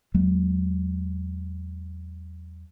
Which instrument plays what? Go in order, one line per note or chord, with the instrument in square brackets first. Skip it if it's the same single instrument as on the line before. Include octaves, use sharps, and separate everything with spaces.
[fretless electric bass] E2 F#3 G#3 A#3